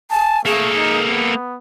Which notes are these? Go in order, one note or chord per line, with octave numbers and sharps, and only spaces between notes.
G#5 A5
A3 A#3 G#4 A4
D#4
B3